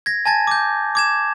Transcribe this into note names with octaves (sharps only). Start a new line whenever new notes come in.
G#6 A#6
G#5 A5 G#6 A6
D6 G6
D6 G#6 E7